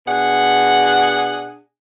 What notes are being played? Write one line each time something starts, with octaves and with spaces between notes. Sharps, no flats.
B2 D4 G#4 F#5